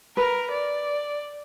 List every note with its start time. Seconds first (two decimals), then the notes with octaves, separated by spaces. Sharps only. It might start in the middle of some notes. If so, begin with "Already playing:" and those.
0.17 A#4 B4
0.51 D5